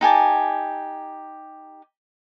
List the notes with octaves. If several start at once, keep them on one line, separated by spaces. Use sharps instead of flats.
D#4 G4 G#5 A5